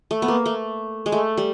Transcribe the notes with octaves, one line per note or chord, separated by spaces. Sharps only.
A3
B3
A#3
A3
G#3
A3
G3